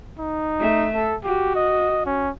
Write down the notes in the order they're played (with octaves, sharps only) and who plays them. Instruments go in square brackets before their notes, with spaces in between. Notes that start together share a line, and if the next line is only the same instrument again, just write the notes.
[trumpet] D#4
[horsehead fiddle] A3 E5
[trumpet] A4
[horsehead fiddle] F#4 [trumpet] G4
[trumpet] D#5
C#4